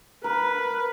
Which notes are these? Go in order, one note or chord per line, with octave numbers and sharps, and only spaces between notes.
A#4 B4